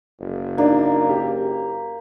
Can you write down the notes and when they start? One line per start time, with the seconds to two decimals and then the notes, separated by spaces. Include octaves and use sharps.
0.20 F#1
0.58 A#3 D4 D#4
1.09 G4